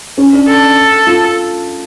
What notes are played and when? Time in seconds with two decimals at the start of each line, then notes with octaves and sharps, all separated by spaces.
0.17 C#4
0.33 D4
0.47 A4
1.07 F4